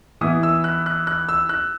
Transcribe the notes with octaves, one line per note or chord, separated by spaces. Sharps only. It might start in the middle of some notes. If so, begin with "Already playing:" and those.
E3 B3 E4 D#6
E6
F#6
F#6
F#6
E6
F#6